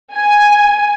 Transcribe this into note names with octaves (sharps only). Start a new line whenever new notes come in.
G#5